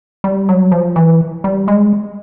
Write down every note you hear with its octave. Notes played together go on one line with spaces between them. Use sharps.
G3
F#3
F3
E3
G3
G#3